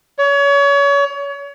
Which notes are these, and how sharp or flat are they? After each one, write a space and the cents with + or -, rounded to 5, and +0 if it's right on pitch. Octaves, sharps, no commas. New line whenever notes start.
C#5 +30